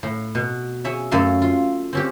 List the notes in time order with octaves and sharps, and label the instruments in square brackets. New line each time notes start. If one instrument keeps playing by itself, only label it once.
[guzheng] A2
B2
G#4 C#5 E5
F#2 A3 A4 F5
F4
C4 C#4 G4